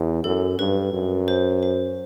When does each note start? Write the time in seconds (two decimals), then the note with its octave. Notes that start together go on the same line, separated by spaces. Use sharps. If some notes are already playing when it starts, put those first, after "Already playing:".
Already playing: E2
0.24 F#2 A4
0.59 G2 B4
0.93 F#2
1.28 C5
1.63 C5